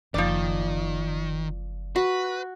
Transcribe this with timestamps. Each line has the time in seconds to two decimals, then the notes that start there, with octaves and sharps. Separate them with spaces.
0.14 F#1 D#3 F3 D5
1.96 F#4 B4